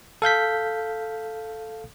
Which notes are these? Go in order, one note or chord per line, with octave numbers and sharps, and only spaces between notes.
A4 F5 G6 B6